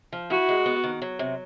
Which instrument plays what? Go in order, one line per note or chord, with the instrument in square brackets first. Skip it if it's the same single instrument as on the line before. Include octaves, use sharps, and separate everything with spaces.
[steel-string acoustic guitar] F3
[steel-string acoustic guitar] E4 [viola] F#4
[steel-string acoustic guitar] G#3
B3
D#3
F#3
C3